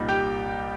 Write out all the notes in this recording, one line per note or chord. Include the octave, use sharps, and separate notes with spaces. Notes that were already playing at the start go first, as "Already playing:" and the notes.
Already playing: C2 A#2 G3 D#4
G4 G5